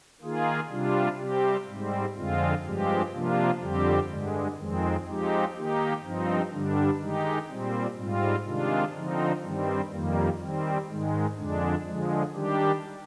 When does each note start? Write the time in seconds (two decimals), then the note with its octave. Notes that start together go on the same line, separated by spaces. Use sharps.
0.21 D#3 A#3 F4 G#4
0.70 C3 G3 D4 F4
1.18 C3 G3 C4 G4
1.67 G#2 G3 C4
2.15 F2 D3 G#3 C4 F4
2.64 G2 F3 G#3 C4 G4
3.13 C3 F3 A#3 D4 F4
3.60 F2 D3 G3 C4 G4
4.09 G2 D3 G#3
4.58 F2 D#3 G#3 C4
5.06 F3 G#3 C4 D#4 G4
5.55 D#3 A#3 D#4 G4
6.03 G2 F3 C4 D#4
6.51 G2 D3 G3 D4
7.00 D#3 G#3 D#4 G4
7.48 A#2 G3 C4
7.97 G#2 G3 C4 F4
8.45 C3 D#3 G#3 D4 F4
8.94 D3 F3 C4 D#4
9.42 G2 D#3 G3 C4
9.90 F2 D#3 G3 A#3
10.39 D#3 G3 C4
10.88 G#2 D#3 G#3
11.36 F2 D3 G#3 D4
11.84 D3 F3 G#3
12.33 D#3 G3 D4 G4